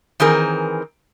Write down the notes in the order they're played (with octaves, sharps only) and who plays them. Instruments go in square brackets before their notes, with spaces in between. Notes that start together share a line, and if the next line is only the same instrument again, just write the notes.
[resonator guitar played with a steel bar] D#3 E3 C4 G#4 A#4